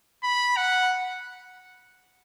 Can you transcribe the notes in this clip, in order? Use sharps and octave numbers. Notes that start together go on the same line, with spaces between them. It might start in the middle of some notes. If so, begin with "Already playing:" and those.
B5
F#5